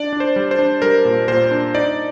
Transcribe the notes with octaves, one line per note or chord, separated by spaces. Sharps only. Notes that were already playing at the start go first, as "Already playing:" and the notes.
Already playing: D4 D5
D4
C5
G3
C5
D4
G3 A#4
A#2
A#2 C5
D4
D#4 D5